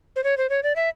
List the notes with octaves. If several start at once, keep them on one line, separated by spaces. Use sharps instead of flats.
C5
C#5
C5
C#5
D5
E5